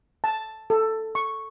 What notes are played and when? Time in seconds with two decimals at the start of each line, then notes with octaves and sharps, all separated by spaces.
0.24 A5
0.70 A4
1.15 C#6